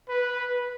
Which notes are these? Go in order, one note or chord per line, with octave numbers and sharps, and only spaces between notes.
B4